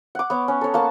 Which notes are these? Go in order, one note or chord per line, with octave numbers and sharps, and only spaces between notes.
F#5 D6
B3 C#5
C#4
A4 C#5
A#3 F#5 A5